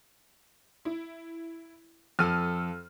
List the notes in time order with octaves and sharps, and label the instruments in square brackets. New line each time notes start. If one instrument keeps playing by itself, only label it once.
[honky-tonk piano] E4
[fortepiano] F2 A4 [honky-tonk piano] F6 D#7